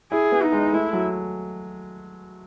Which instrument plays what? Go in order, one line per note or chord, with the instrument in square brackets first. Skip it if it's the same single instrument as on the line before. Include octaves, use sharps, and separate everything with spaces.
[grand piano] E4 [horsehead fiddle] G#4
[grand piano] B3
[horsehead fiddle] D#4
[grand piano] G#3
[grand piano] A3 [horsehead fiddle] E4
[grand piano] F#3